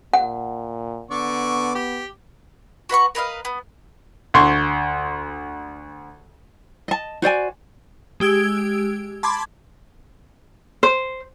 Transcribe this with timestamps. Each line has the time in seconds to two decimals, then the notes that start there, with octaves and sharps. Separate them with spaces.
0.14 A#2 F#5
1.11 D3 B3 D5 C#6
1.75 G4
2.89 F#4 B4 F#5 C#6
3.15 A#4 B4 D#5 F5
3.45 B3
4.34 D2 C6 C#6
6.88 D#5 A5
7.22 F#4 C5 D5 G#5
8.20 G#3 G4 E6 G#6 D7
9.23 A5 B5 C6 D6 G#6
10.83 C5